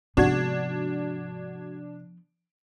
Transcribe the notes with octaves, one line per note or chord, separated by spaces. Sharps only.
G#2 C3 F3 B3 D4 F#4 G#6